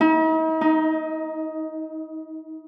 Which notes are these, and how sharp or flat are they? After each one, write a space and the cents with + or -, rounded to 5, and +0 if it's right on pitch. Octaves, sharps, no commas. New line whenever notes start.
D#4 +45
D#4 +15